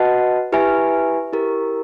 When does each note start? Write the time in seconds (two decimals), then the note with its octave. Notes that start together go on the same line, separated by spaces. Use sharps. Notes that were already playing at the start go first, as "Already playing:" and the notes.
Already playing: F#4 B4 D#5 F#5 A5
0.52 E4 G4 B4 E5 G#5
1.33 E4 G4 A#4